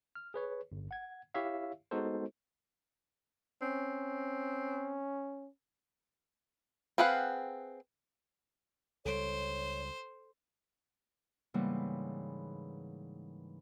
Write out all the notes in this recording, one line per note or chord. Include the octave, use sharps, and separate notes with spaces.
F6
G#4 B4 C#5
G1
F#5 G#6
E4 G4 C#5 E5 F5
G#3 B3 D#4 F#4 A4 C5
C4 C#4
C4 G#4 B4 F5 F#5
C#2 G3 A4 C5 C#5 D7
G#2 C#3 E3 G3 A#3 B3